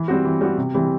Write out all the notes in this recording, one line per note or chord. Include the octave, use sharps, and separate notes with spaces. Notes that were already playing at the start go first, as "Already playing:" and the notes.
Already playing: E3
G3 C4 F#4
E3
G3 C4 F#4
C3
E3 G3 C4